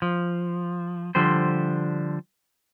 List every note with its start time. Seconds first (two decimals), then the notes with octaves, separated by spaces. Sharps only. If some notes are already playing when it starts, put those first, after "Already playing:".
0.02 F3
1.15 D3 F3 G3 C5